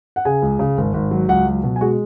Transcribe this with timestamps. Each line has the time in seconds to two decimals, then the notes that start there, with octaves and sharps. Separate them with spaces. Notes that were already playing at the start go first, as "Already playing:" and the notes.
0.16 F#5
0.25 C#3 G#4 G#5
0.42 C#2
0.59 C#3
0.78 G#1
0.94 G#1
1.11 F#3
1.29 C#2 F#4 F#5
1.47 F#3
1.63 B2
1.76 G#5
1.81 G#3 F#4 F#5